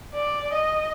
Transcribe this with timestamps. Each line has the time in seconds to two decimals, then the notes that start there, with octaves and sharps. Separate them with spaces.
0.14 D5
0.54 D#5